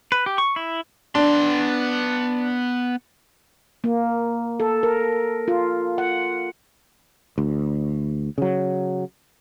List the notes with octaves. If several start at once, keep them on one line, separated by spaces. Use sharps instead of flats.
B4
G4
C#6
E4
B3 D4 C6
A#3
A4
A#4
F4
F#5
D2
C#3 F#3